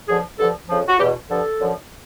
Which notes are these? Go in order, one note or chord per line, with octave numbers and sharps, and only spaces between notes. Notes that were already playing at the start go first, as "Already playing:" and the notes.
F#2 D3 F3 G#4
G2 D3 F3 A4
F2 C#3 F3
F#4
E2 B2 G4
G2 D3 F3 A4
F#2 D3 F3